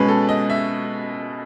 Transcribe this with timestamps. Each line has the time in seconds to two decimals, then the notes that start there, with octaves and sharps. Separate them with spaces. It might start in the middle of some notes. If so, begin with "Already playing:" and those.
Already playing: B2 G#3 C#4 B4
0.08 A4
0.29 D#5
0.50 E5